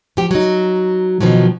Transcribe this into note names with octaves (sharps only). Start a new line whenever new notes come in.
F3 G4
F#3 D#4
B2 D#3 F3 F#3